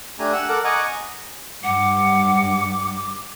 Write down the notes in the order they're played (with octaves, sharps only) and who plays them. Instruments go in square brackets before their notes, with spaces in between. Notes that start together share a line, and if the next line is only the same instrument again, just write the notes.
[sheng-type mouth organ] A3 D4 G4 G#5 A#5
F#5 E6 F#6
A4 A#4 F#5 D6
D#5 F#5 G#5 A#5 C#6 D6
[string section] G2 [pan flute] F#5 [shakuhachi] D6